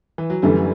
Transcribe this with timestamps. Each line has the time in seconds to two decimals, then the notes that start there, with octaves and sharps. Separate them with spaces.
0.18 E3
0.30 F#3
0.42 F#2 D3 E3 G3 A3